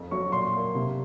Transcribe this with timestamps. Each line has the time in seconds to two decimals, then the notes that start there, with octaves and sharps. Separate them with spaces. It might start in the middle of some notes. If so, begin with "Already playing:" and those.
Already playing: F2
0.11 F#3 C#6
0.32 A#2 C6
0.53 A#3
0.75 C3